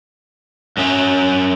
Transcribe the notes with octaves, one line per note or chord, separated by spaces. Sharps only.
F#2 F#3 C#4 E5